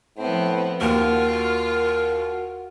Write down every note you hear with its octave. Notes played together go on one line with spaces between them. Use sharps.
A2 F3 B3 C4
D#2 F4 F#4 A#4